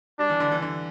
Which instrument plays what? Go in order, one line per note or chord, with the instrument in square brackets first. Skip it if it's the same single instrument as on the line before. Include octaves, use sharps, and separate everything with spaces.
[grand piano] G3 [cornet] D4
[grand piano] E3
D3
E3
D3